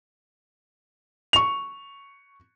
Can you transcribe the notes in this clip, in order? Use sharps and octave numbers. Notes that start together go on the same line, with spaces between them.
C#6 F7